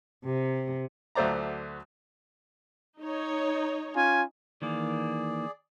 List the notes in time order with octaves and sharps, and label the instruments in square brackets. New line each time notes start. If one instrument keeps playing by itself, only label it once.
[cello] C3
[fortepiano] D2 F#3 A3 C5 D5 A#5
[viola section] D#4 C#5
[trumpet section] C#4 F4 G#5
[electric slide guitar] D#3 E3 A#3 [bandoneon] G#4 D5